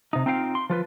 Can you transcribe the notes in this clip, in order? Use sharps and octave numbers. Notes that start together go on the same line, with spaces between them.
C3 D#4
C4 D#4 F4 F5 G5
C6
F3 F4 B4